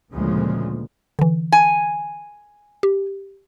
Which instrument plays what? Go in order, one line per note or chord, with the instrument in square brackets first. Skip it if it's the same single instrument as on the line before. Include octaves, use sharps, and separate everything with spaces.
[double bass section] D2 A#2 C#3 F3 G#3
[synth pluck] D3 E3
[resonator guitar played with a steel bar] G#5
[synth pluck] G4